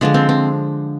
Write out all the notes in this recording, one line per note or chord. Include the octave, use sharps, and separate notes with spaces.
D3 F3 G#3 D4
C4
C4